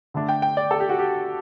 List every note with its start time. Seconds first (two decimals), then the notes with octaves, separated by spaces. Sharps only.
0.14 D3 A3 D4
0.29 G5
0.42 G5
0.57 D5
0.71 A4
0.80 G4
0.89 F#4
0.99 G4